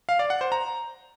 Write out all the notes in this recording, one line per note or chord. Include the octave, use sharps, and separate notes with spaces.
F5
D5
F#5
C5
A#5